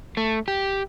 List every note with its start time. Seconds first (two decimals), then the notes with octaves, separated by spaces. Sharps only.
0.17 A3
0.48 G4